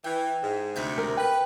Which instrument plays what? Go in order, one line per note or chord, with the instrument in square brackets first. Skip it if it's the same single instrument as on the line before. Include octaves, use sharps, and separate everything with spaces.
[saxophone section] E3 [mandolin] G5
[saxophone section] G#2
[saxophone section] D2 C3 [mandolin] D#4 E5 G6
[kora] A#4
[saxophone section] B4 [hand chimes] G5